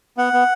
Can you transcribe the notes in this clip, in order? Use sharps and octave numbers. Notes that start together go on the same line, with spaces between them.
B3 F#5
B3